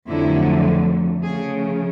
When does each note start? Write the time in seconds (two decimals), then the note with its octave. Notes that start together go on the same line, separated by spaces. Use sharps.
0.08 F2 D3 F#3 A3 E4
1.22 C#3 F3 A3 G#4